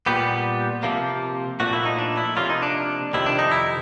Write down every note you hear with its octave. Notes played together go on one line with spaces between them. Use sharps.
A#2 G3 B3 G4
C3 F3 A#3
A#2 F3 A3 F#4
E4
D#4
D4
E4
C3 F3 A#3 C#4 F4
D#4
D4
F2 C3 D#3 E4
D4
D#4
E4